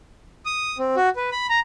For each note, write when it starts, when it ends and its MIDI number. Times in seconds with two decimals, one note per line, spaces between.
0.46 0.78 87
0.79 0.96 60
0.96 1.09 66
1.16 1.30 71
1.32 1.47 83
1.49 1.60 82